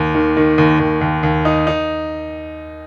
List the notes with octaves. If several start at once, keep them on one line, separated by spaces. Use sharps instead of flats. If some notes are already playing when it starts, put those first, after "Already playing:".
Already playing: D#2
D#3
D#3
D#2
D#2
D#2
D#2
D#4
D#4